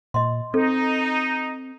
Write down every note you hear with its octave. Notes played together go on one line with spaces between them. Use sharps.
A#2 D#5 C6
C4 D#4 A4